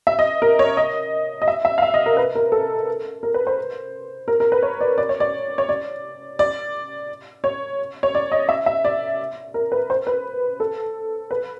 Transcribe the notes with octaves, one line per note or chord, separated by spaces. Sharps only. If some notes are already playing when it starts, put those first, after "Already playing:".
E5
D#5
A#4
C#5
D#5
D#5
E5
E5
F5
E5
D#5
A#4
B4
A#4
A4
A#4
B4
C5
A#4
A#4
B4
C#5
D5
D5
C#5
D5
C#5
D5
D5
C#5
C#5
D5
D#5
E5
E5
D5
A#4
B4
C5
B4
A4
B4